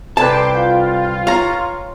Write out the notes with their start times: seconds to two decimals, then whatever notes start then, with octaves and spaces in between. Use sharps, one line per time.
0.17 C2 A4 B4 G5 A5 C6 D6
0.54 F4 G5
1.27 C#5 F5 A#5